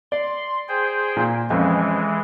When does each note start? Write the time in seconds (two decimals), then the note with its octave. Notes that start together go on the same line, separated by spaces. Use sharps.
0.12 D5 C6
0.69 G#4 C5 G5
1.17 A#2
1.50 F2 E3 G#3 C#4